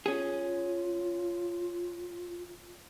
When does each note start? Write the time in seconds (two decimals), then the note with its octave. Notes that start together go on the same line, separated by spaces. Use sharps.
0.06 C#4 F4 G#4